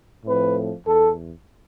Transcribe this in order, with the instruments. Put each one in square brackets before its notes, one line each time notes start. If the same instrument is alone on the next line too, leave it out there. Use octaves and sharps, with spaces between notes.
[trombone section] A2 F3 A3 C4 B4
E2 A4